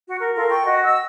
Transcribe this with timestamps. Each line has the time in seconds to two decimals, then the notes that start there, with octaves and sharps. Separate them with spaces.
0.08 F#4
0.20 A#4
0.35 F4 A4 A#4
0.49 G5 C#6
0.63 F#4 D#5
0.83 E6